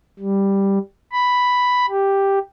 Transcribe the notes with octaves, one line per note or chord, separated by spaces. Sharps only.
G3
B5
G4